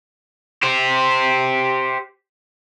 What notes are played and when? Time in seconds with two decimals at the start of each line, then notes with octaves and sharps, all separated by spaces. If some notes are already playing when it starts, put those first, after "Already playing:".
0.63 G4 C5